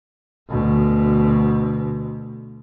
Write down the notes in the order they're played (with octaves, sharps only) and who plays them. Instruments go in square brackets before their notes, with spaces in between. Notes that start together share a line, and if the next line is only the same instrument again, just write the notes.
[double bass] D2 B2